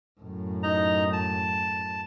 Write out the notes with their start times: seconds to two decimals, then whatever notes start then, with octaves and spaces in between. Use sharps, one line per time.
0.21 F#2 A2
0.63 D#4 A#5
1.13 A5